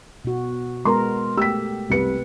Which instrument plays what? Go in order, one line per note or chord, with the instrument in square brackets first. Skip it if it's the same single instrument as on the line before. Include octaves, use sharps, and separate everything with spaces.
[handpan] B2 F#4
[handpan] G#3 B3 A#4 [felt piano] A#5 C6
[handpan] A3 G4 [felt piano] E6 B6
[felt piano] C2 C#7 [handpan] C3 B4